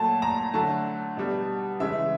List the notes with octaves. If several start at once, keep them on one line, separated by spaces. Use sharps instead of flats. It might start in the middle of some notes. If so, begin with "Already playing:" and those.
Already playing: A#2 F#3 A3 A5
A#5
D3 F#3 A3 A5
B2 G3
C#3 E3 G#3 E5